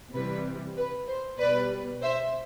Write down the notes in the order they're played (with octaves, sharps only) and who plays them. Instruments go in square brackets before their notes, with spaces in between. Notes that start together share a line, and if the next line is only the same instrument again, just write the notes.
[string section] C3 E3 G3 B4
B4
C5
B2 G3 B4 D5
C5 E5